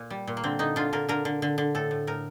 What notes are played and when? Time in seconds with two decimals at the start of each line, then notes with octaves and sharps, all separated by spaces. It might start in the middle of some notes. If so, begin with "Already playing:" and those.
Already playing: A#2
0.10 G3
0.27 A#2
0.37 A#3
0.44 D3 C4
0.59 D3 D#4
0.76 D3 F4
0.93 D3 A#4
1.09 D3 A#4
1.25 D3
1.42 D3
1.58 D3
1.75 A2 A4
1.91 A2
2.07 A2 A#4